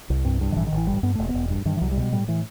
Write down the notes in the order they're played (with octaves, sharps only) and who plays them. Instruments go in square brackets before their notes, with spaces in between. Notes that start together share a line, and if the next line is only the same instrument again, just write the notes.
[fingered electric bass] C2
G2 C4
G2
D#3
A1 E3
D#3
A1
E3
G1 G3
G2 B3
E1 A3
B3
E1
G2
G2 D#3
E3
C2 F#3
G3
B2
G3
A2 G3
A2 E3